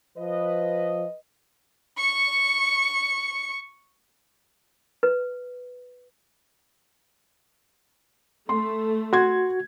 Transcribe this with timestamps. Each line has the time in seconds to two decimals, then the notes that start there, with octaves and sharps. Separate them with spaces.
0.17 F3 B4 D#5
1.98 C#6 C#7
5.03 B4
8.49 A3 C6
9.13 F#4 C6 G#6